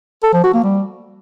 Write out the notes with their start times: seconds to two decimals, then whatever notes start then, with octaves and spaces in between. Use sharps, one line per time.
0.23 A4
0.33 F3
0.44 F#4
0.54 A#3
0.64 G3